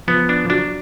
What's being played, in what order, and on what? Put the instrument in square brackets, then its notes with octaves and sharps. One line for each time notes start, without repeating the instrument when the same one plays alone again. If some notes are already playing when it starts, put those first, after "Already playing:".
[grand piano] F3 [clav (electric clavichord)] B3
[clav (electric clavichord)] D4
[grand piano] F3
[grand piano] F#3 [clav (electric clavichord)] D4